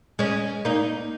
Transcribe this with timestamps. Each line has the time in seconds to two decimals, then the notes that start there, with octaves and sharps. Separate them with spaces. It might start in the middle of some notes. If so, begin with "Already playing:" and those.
0.19 G#3 C#4
0.65 A#3 D#4